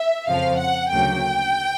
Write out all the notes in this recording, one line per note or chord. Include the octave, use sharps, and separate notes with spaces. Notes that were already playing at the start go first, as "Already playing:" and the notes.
Already playing: E5
F2 C#3 F3 F5
F#5
D2 C#3 F#3 A#3 G5